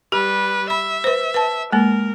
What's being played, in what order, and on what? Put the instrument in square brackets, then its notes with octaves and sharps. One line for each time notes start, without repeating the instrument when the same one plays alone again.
[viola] G3 B4 [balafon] G4
[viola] E5 [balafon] B5
[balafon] B4 C5
B4 A5
[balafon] G#3 A#3 [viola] A#4